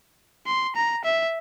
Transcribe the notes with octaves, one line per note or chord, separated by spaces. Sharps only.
C6
A#5
E5